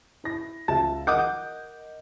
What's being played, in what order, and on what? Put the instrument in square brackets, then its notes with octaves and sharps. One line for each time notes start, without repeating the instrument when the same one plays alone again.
[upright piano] E4 A#6
[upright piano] C#2 E5 [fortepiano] A5
[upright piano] A#4 D#5 G6 [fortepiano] F#5 D6 D#6